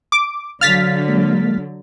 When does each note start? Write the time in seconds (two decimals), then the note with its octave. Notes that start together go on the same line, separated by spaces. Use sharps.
0.12 D6
0.61 D3 F#3 F5 F6 A6 B6
1.08 G#3 A#3